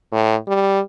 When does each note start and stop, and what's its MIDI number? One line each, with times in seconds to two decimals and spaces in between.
0.12 0.36 45
0.48 0.81 55